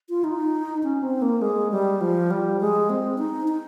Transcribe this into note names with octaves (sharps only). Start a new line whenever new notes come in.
F4
D#4
C#4
C4
A#3
G#3
G3
F3
G3
G#3
C4
D#4
D#4